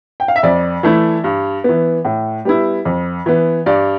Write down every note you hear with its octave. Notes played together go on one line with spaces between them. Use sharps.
G5
F5
E5
F2 D5
E3 A3 E4
G2
E3 B3
A2
G3 B3 E4
F2
E3 B3
G2 D5